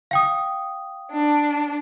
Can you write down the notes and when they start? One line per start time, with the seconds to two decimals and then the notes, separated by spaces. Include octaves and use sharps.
0.11 F5 G5 D#6
1.11 D4